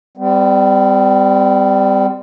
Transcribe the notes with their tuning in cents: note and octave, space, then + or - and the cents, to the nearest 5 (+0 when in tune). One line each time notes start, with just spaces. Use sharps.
G3 +10 C4 -35